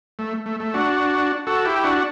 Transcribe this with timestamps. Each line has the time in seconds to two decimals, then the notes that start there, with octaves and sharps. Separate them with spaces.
0.19 A3
0.46 A3
0.60 A3
0.74 D4 F#4
1.47 F#4 A4
1.65 E4 G4
1.84 D4 F#4